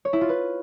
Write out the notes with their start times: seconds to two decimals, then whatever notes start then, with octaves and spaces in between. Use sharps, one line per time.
0.05 C#5
0.13 E4
0.21 F4
0.29 B4